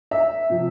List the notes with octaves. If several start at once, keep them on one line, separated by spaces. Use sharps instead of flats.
E5
C3 F3